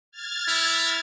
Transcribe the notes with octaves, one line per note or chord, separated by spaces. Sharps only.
F6 G#6 A6
E4